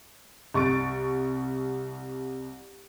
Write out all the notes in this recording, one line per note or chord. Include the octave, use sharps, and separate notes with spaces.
C2 C#6 A6 D7